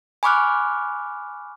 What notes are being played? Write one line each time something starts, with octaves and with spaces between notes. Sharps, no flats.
G#5 B5 C#6 D6 F6 F#6